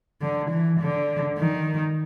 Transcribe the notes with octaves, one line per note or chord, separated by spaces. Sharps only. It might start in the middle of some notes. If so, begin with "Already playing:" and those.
D3
E3
D3
D#3